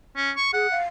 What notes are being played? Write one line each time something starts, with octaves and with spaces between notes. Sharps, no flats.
C#4
C#6
G#4 F#5
F5